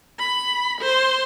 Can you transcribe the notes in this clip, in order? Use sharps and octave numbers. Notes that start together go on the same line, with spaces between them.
B5
C5